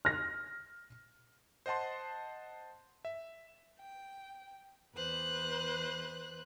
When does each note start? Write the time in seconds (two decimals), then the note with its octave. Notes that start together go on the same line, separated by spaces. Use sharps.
0.05 F6 A#6
1.66 C5 D#5 F#5 A5 C6
3.05 E5
3.78 G5
4.95 E2 B4 C5 F#6